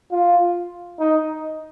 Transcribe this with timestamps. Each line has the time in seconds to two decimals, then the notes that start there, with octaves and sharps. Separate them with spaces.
0.11 F4
0.99 D#4